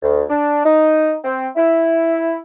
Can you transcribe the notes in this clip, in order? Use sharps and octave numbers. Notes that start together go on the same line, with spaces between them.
D2
D4
D#4
C4
E4